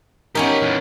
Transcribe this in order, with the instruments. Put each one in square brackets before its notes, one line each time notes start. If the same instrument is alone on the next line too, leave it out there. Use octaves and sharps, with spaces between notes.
[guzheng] B3 C#4 D#4 [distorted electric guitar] G4 G#5 [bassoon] A#4
[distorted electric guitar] E2 A#2